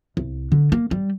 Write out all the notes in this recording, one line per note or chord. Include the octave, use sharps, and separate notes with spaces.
C2
D3
A#3
G3